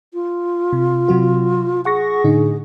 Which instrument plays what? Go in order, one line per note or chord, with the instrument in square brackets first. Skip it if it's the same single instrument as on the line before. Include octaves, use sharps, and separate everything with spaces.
[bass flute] F4
[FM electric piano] C3
C3 F#3 F#4
[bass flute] G#4 [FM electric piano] F#5 C#6 A#6
[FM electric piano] A2 D3 D#4